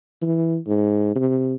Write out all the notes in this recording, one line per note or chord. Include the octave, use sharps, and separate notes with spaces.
E3
G#2
C3